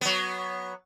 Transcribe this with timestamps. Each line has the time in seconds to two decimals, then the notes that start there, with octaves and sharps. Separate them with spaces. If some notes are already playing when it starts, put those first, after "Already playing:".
0.01 F#3 B3